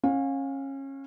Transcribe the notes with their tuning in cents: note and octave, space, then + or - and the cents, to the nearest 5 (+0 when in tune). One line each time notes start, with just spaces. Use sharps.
C#4 -25 F5 +30